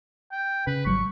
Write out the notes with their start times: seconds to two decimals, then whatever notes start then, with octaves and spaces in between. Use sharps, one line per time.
0.32 G5
0.67 C#3 B4
0.86 G#1 F#3 G3 C#6